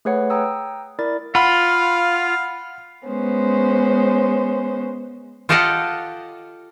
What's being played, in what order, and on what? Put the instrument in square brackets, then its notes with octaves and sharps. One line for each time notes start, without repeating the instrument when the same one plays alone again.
[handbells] A3 G#4 B4 C#5 F#5
G5 A#5 D#6 E6
E4 A#4 D5 B5 A6
[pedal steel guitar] F4 [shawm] F5 [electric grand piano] F#5 B5
[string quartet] G#3 B3 C#4 C5
[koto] F4 G4 A4 D#5 F5 F#5